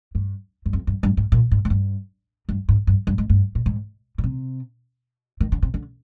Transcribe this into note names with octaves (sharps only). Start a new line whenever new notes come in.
G2
G2
F2
G2
G2
G#2
A#2
G#2
G#2
G2
G2
G#2
G2
G2
G#2
G2
A#2
G#2
A#2
C3
D#3
D3
C3
D3